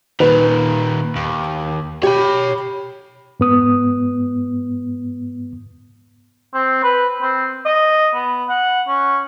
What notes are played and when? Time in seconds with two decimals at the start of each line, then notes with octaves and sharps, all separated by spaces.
0.20 A#2 D#3 B4
1.16 D#2
2.03 G4 C#5 B5
3.40 G#2 B3 D#6
6.54 C4
6.83 B4
7.22 C4
7.65 D#5
8.15 B3
8.49 F#5
8.88 C#4